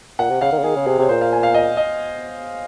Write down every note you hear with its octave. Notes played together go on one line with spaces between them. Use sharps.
A#2 F#5
C3
C#3 F5
D#3
C#3
D#3 G#4
C#3
C3 G#4
C3
C#5
A#2 C5
F5
G#5
F5
D#5
D#5